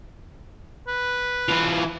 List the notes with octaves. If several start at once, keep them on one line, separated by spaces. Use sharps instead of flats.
B4
E3 F4